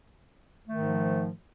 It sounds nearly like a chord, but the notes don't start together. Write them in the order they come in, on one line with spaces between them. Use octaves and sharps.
A3 D#3 G#2 F3